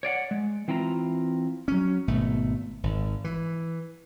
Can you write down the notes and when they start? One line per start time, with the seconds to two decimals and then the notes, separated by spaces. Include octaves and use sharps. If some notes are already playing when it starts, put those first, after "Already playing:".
0.03 C#5 D5 F5 F#5
0.31 G#3
0.68 E3 C4 E4 F4 D#5 A#5
1.68 F#3 C#4
2.08 G#1 B2 A3
2.83 G#1
3.24 E3